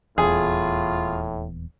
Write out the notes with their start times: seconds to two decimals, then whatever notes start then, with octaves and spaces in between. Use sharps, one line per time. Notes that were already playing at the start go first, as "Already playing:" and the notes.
0.18 D#1 E2 A2 F4 G#4